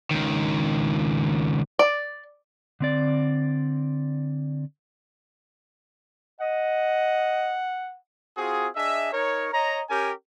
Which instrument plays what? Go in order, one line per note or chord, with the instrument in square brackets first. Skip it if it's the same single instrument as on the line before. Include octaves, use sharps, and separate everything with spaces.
[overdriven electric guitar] C#2 D#3
[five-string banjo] D5
[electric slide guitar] D3 C4 D5
[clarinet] D#5 [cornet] F#5
[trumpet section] C4 F4 F#4 G#4
D4 G#4 D#5 E5
D#4 A#4 C#5
C#5 D#5 A#5
C#4 G4 A#4 G5 G#5